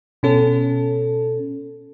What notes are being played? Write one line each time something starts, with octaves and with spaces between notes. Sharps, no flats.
B2 C#4 A4